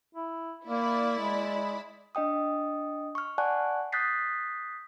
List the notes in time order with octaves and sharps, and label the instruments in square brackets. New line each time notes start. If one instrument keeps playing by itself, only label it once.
[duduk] E4
[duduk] A#3 [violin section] E4 D5 B5
[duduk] G#3
[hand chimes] D4 D#5 G5 D#6
C#6 F6
D5 F#5 G#5 A5 C#6 F#6
D#6 F#6 G6 A6 B6 C7